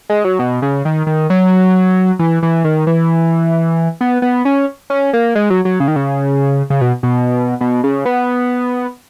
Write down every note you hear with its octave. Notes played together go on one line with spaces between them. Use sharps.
G#3
F#3
B2
C#3
D#3
D#3
F#3
E3
E3
D#3
E3
B3
B3
C#4
C#4
A#3
G#3
F#3
F#3
C#3
D#3
C#3
C#3
B2
B2
B2
C#3
B3